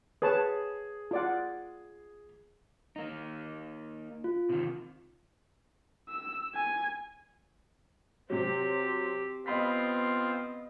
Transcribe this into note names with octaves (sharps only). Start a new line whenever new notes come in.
G#4 B4 C#5 A5
F4 D5 F#5
A#3 D#4
F4
C3 D#3
E6
G#5
C3 F#3 C4 G4
B3 C4 F4 D#5 B5 B6